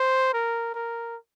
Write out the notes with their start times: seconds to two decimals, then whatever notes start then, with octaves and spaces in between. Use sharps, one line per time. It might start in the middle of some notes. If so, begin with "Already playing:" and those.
Already playing: C5
0.33 A#4
0.74 A#4